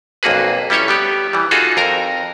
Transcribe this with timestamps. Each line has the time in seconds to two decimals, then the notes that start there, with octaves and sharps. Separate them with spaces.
0.23 B1 F2 A#3 F#4 G#4 B4
0.70 G3 C#4 E4 A4 C#5
0.88 G3 B3 G4
1.33 E3 G3
1.51 D#4 F4 F#4 G#4 A4
1.77 F2 A#4 A#5